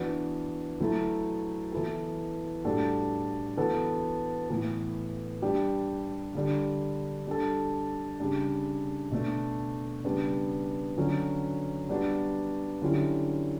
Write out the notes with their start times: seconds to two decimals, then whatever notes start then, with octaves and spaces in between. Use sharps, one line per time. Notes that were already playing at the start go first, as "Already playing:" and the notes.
Already playing: E3 B3 D4 F#4
0.80 F#3 A3 E4 A4
1.72 E3 B3 E4 A4
2.65 A2 G3 D4 F#4 A4
3.57 E3 B3 F#4 A4
4.50 A2 E3 B3
5.42 G3 D4 G4
6.35 D3 G3 D4
7.27 G3 D4 A4
8.20 C#3 G3 D4
9.11 B2 A3 D4
10.04 C#3 G3 B3 D4
10.97 D3 F#3 C#4
11.89 G3 B3 D4 F#4
12.82 D3 F#3 C#4 E4 G4